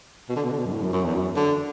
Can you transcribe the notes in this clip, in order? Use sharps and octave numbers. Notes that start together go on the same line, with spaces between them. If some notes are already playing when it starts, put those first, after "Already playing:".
B2
D3
B2
D3
B2
F#2
A2
F#2
F#2
E2
F#2
D3